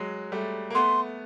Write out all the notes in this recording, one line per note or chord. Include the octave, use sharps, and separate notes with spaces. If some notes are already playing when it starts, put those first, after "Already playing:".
Already playing: F#3 G#3
G3 A3
A#3
A3 B3 C6